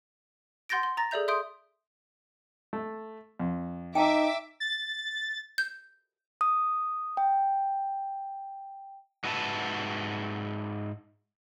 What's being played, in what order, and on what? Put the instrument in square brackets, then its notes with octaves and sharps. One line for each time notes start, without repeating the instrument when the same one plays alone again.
[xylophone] F#5 C6 G6 A6 A#6 D7
C6
A#5 A6 A#6
G#4 A4 D5 E5 G6 F7
E5 C6 D#6 G6 D7
[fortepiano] A3
F2
[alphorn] D#4 [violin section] E5 D6 [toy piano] G5 A5 A#5
[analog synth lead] A6
[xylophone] G6
[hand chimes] D#6
G5
[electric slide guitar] G#2 F#4 B4 E5 G#5 A5